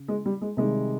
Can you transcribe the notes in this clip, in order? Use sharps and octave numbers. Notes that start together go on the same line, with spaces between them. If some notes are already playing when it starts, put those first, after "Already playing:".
Already playing: C#3
G#3
G3
G#3
C3 D#3 G3 G#3